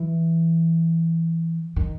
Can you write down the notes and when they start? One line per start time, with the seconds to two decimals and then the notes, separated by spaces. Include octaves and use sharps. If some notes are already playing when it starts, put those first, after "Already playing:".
Already playing: E3
1.76 D#3